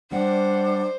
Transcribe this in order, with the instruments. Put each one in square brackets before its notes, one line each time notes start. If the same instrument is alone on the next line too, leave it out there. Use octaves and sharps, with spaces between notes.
[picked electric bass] G3 [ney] D4 [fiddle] C5 [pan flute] F#5